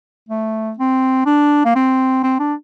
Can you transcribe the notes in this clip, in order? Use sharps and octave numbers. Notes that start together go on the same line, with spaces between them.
A3
C4
D4
A#3
C4
C4
D4